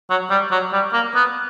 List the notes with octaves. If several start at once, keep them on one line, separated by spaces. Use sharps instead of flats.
F#3
G3
F#3
G3
A#3
B3